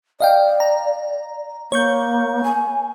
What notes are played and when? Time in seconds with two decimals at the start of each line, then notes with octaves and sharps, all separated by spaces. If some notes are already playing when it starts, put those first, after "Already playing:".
0.20 D5 D#5 F5 G5
0.60 A#5
1.72 A#3 C#5 C#6 G6
2.44 G#5